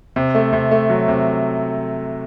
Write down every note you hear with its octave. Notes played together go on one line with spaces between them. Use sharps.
C3
A3
C3
A3
F#3
C3